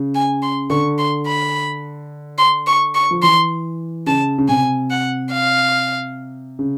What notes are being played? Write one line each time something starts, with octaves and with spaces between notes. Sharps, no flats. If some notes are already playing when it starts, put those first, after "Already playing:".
Already playing: C#3
G#5
C6
D3 C#6
C6
B5
C6
C#6
C#6
F3
E3 C6
C#3 A5
C#3
C3 G#5
F#5
F5
C#3